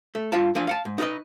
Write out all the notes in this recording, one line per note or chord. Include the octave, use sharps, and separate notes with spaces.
A3
G2 F4 F5 A5
F3 D4 F5 G#5
F5 F#5 A5
G#2
D#4 F#4 G#4 B4 D#5